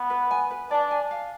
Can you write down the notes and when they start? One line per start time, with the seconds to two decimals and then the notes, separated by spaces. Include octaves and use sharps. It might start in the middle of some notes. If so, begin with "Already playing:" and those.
Already playing: B3
0.10 B4
0.31 G#5
0.51 B4
0.71 D4 D5
0.91 G#5
1.11 F5